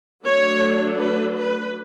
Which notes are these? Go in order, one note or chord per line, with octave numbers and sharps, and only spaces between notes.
F#3 A3 D4 C#5
B4
B4